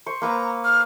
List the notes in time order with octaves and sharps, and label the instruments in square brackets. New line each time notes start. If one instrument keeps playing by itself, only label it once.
[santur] C5 C#6
[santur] A#3 B4 E6 [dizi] A#5
[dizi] F6